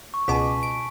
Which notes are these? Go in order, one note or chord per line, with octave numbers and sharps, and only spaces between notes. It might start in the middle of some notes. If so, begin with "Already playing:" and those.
C#6
C#2 B2 G#5 A5 D6 B6
D7